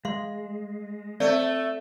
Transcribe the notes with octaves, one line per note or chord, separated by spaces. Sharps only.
G#3 F5 C6
A3 C4 D5